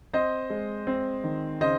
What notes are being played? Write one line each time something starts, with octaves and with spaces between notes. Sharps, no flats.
C4 C5 D#5
G#3
C4
D#3
C#3 C5 D#5